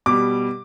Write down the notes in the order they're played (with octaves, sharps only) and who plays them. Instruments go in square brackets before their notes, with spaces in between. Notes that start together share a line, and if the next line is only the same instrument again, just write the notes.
[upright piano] B2 G3 D6